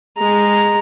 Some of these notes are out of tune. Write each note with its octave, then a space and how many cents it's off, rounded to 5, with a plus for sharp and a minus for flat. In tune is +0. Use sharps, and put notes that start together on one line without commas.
G#3 -15 A#5 +0